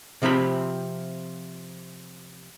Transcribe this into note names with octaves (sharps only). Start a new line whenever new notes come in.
C3 F3 C4 G4 B5